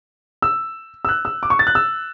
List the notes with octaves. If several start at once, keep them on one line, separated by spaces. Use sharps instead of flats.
E6
E6
F#6
E6
D6
C#6
A6
F#6
E6